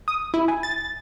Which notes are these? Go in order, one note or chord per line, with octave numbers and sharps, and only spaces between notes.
D#6
E4
G#5
A6